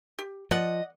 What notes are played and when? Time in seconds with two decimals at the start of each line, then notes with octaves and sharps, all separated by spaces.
0.19 G4
0.51 F3 D5 D#5 F#5